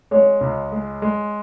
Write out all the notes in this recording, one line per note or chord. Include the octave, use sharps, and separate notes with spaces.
G#3 C#5
C#2
G#3
G#3